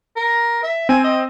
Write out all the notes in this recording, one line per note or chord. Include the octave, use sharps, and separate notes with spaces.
A#4
E5
C4 G#5
D#5